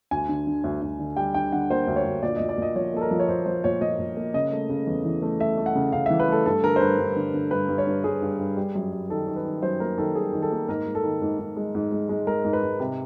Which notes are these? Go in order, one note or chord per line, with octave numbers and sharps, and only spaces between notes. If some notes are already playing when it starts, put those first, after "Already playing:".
D2 G#5
D3
D3
D2
D2
D3
G3 G5
D3 G5
D3 F#5
A#3 C5
D2
C#5
D2
A#2 D5
A#2 D#5
D5
A#2 D#5
F3 C#5
A#3 A4
A#4
F3
C#5
A#2 C5
F3 C5
A#2 C#5
A#2 D#5
A#2
A#3
C#3 D#5
A3
C#3
E2
E3
A3
A3 E5
A3
F#5
C#3
C#3 F5
E3 E5
B4
A3 A4
G2 A4
D3 A#4
C5
G2 B4
G2
D3
D3
G2 B4
G2
C#5
G2
G2 G#4
G2
G2
G3
F#2
G3
D#3 A4
D#3
B4
D#3
F#2 C5
A#3 A#4
D#3 A4
G3 G#4
D#3
A4
A#3
G#2 A#4
G#3
A4
D#3
G#2
G#2
G#3
G#2
G#3
G#3
G#3 A#4
G#2
B4
G#2
C3